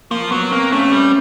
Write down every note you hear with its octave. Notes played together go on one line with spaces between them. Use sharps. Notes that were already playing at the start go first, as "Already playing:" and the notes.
F3 A#3
F#3 B3
A#3 C4
A3 C#4
G3